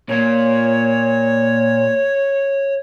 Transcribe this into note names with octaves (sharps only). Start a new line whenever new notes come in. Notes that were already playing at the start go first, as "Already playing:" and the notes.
A#2 A#3 C#5